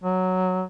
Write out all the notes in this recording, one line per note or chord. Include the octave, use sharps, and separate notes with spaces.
F#3